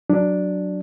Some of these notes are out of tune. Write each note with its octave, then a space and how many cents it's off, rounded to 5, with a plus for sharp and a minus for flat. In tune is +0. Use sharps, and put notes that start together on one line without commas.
F#3 +0 D4 +0